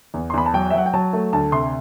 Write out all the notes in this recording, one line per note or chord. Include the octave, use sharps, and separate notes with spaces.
E2
C6
E2 B5
A5
F#3 G5
E5
F#3 F#5
G5
F#3 A5
A3
D2 A5
C3 C6